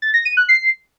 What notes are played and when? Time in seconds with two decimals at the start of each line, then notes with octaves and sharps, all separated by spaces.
0.02 A6
0.14 A#6
0.25 D#7
0.37 F#6
0.49 C7